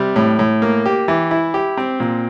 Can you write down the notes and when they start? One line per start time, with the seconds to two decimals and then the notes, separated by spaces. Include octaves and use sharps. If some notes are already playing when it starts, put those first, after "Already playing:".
Already playing: C3 G3
0.16 A2
0.39 A2
0.62 A#3
0.86 G4
1.08 E3
1.31 E4
1.54 G4
1.77 C4
2.00 A#2